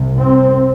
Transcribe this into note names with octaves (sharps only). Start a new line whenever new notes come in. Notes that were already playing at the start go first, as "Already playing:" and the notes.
Already playing: C2 C3
C4